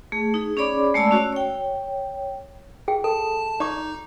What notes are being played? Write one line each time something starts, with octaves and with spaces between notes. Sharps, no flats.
A3 G#4
D#4 G#4
C#4 G#4 C#5 D5 B5 D6
G#3 A3 D5 A5 E6
C#4 F#4 C#5
C#5 G5
G#4 G5
A4 A5
D#4 D5 C#6 D6